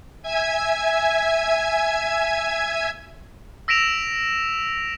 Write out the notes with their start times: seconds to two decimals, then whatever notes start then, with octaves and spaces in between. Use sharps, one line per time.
0.23 E5 G#5 G#6
3.68 E6 A#6 B6 D7 E7 F7